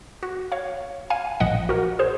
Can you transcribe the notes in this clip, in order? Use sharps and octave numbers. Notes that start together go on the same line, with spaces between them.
F#4
C#5 F5
F5 G#5
A#1 A#2 F3 D#5 F#5
F#4 A#4
G#4 C5